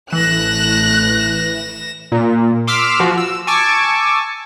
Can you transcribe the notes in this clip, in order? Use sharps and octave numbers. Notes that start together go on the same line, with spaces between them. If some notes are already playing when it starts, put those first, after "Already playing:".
A1 E3 A3 F#6 A#6 E7
A#2
C6 D6 E6 F6 B6
F3 F#4
E6
G#5 A5 C#6 D6 E6